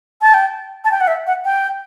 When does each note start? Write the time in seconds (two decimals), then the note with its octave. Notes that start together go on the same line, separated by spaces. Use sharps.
0.22 A5
0.34 G5
0.85 A5
0.91 G5
1.01 F#5
1.07 E5
1.27 F#5
1.45 G5